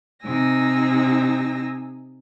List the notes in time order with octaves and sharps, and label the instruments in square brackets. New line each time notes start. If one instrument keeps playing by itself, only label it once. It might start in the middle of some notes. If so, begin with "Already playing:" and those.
[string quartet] C3 D#4 G#5 E6 A#6